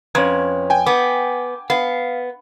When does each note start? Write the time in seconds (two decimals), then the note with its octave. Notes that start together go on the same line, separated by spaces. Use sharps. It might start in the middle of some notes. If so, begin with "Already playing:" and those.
0.15 F2 C#4 B4 C#5 G#6
0.70 G5 G#5
0.86 B3 D6
1.70 B3 F5